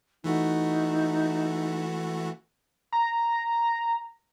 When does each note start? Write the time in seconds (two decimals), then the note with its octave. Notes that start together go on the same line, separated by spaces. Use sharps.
0.24 E3 A3 D#4 F#4
2.92 A#5